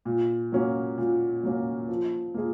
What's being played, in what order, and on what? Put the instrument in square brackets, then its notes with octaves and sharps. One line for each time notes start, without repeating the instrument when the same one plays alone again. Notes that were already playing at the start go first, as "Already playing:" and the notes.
[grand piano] A#2
F#3 A#3 C#4
A#2
F#3 A#3 C#4
F3
A#3 F4 G#4